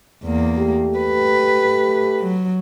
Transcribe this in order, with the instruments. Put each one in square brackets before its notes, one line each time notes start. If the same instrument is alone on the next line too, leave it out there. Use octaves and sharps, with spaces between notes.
[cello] E2 A#3
[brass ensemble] A3 G4
[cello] B4
F#3